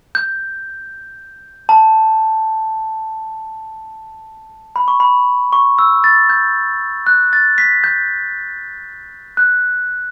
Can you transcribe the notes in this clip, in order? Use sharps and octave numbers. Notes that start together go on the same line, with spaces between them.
G6
A5
B5
C#6
B5
C#6
E6
A6
G6
F#6
A6
B6
G6
F#6